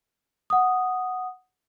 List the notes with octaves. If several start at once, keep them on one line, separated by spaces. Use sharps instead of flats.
F#5 D#6